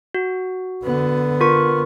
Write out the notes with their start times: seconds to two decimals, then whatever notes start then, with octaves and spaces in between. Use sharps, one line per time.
0.14 F#4
0.84 D3 B3
1.41 F4 A#4 C#6